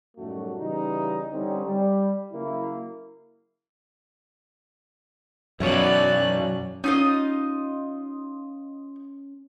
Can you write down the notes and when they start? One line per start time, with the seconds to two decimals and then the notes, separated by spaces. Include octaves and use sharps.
0.17 F#2 A2 D#3 G3 A3 F#4
0.59 C#3 E3 G3 D#4
1.32 D3 G3 C4 C#4 D#4
1.64 G3
2.32 C#3 F#3 A#3 E4
5.60 B1 F#2 B2 E3 F#3 C#5 D5 F#6
6.84 C#4 D#4 F4 D#5